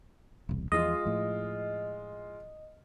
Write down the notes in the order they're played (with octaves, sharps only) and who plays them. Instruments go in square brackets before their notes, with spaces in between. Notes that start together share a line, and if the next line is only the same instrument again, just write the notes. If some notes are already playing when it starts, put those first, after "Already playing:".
[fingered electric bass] E1 C2
[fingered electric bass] E2 F3 [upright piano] G#3 F4 [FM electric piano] D#5
[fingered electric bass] A2 F3